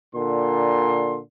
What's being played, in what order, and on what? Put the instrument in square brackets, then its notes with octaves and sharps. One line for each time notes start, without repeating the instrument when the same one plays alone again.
[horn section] A#2 D3 C6